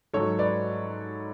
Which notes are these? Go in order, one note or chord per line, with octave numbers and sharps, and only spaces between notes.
G#2 F#3 A4 C#5
B4 D5